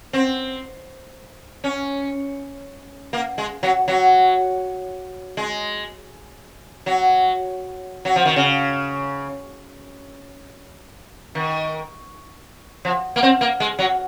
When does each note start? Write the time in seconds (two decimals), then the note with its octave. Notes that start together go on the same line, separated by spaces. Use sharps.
0.13 C4
1.64 C#4
3.13 A#3
3.38 G#3
3.63 F#3
3.88 F#3
5.37 G#3
6.86 F#3
8.05 F#3
8.16 F3
8.25 D#3
8.36 C#3
11.35 D#3
12.85 F3
13.16 A#3
13.23 C4
13.41 A#3
13.60 G#3
13.79 F#3